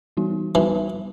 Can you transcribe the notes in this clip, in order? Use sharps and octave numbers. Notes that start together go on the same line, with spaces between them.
E3 G3 B3 D#4 F#4
E3 G3 B3 D#4 F#4